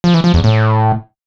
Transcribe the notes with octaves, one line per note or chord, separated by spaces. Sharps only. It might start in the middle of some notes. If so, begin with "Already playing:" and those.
F3
E3
F3
E2
A2